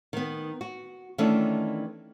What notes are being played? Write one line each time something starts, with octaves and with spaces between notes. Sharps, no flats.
D#3 B3
F#4
D#3 E3 A3 B3 C#4 D4